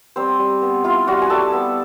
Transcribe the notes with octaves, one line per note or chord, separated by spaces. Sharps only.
G3 C4 C5
G3
B3
E4 F4 F5
G3 F#4 F#5
G#5
G3 A4 A5
B3